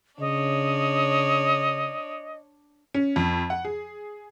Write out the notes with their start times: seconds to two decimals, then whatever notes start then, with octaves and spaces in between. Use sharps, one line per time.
0.20 C#3 D4 C#5 D#5
2.94 C#4
3.16 F2
3.50 F#5
3.65 G#4